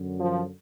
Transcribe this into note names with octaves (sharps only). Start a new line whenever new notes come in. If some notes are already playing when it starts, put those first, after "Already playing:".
Already playing: F#2 D3
F3